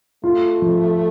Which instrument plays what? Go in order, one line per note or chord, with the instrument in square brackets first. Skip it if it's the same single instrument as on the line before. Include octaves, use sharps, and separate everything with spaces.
[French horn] A3 [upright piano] F4
[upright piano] F3